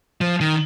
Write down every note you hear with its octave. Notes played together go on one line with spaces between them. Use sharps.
F3
D#3